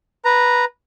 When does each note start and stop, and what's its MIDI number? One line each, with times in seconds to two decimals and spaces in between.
0.25 0.65 71
0.25 0.65 82